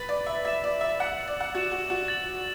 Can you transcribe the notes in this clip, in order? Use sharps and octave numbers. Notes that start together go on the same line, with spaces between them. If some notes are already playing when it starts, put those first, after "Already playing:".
Already playing: B4 A6 F#7
D5
E5
E5 A6 E7
D5
E5
F#5 E6 A6 F#7
D5
F#5
F#4 A6 E7
F#4
F#4
A6 F#7